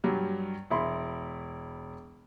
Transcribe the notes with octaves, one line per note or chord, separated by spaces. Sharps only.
G2 F#3 G3
E1 E4 B5 C6